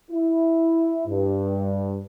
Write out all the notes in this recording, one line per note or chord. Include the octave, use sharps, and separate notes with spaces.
E4
G2